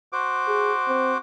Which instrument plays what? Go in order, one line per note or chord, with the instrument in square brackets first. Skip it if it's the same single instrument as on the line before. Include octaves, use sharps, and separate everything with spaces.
[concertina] F#4 C5 D6
[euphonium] G#4
C4